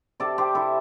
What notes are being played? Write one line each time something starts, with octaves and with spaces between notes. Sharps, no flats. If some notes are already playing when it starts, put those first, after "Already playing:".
C3 A4 D5
C3 G4 C5
C3 E4 A4